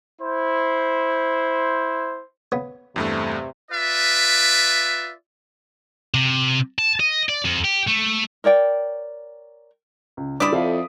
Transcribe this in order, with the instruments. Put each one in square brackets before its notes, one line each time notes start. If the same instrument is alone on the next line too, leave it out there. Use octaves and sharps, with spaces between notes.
[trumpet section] E4 C5
[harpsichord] C#3 B3
[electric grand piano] E2 G2 A3 [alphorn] C3
[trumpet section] F4 B4 D5 E5
[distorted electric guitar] C3
A5
D#5
D5
F2
G4
A3
[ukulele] A#4 C#5 D5 G5
[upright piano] C#2
[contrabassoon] G2 [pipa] E4 D5 [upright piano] D#6 B6 D7
[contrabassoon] F2 [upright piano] A4 E5 F5